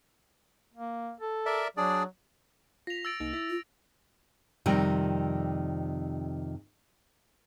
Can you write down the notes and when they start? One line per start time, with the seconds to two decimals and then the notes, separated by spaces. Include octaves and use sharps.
0.74 A#3
1.20 A4
1.46 A#4 D5 E5
1.77 F#3 D4 G#4 D5
2.87 F4 A#6 B6 F7
3.05 E6 A6 D7
3.20 C2 A#3 D#4
3.33 E4
3.49 F4
4.66 F2 C3 D#3 G3